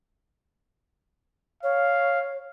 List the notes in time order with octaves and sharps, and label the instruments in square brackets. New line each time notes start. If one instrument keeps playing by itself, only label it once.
[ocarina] C#5 [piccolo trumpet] F5